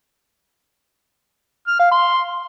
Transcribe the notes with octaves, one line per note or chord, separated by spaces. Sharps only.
F6
F5
C6